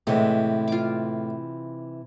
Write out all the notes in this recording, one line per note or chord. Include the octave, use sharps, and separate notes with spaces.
A2 C3 E3 G#3
F4 D6